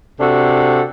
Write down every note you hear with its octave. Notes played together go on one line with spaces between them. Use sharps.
C3 D4 F#4 A4